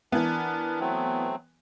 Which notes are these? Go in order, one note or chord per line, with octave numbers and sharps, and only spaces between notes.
E3 B3 D4 A#4
F#3 A3 C4